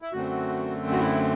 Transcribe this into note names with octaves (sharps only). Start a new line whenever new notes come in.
E4
F#2 D3 A3 C4 F#4
F#4
E4